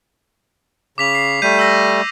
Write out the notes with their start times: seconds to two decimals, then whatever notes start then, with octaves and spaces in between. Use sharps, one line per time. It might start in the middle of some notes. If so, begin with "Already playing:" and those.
0.98 C#3 D6 B6 F7
1.15 C7
1.42 G3 A3 G6 B6 D#7
1.59 E6 A#6